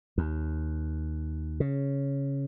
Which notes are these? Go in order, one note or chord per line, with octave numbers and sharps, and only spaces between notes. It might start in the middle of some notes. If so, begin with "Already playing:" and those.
D#2
C#3